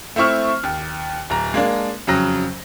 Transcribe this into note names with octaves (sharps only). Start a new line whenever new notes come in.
A3 C4 E4 C#6 F6
D#2
D1 A#5
G#3 A#3 D4
F2 C#3 F#3 A#6